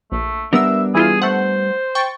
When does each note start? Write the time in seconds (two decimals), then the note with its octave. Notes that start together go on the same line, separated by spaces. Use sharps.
0.12 A#1 A3
0.53 G3 B3 D4 A#4 E5 E6
0.95 E3 E4 F4 G#4
1.22 A3 C5 F#5
1.95 G5 C#6 A6